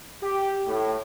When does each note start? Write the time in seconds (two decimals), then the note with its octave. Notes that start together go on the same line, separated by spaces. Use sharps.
0.23 G4
0.67 A2